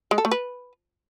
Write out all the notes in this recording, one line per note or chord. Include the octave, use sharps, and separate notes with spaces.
G#3
A4
A3
B4